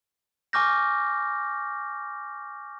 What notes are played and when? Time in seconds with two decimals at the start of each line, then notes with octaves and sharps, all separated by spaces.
0.53 G#5 C#6 D6 F6 G6 A#6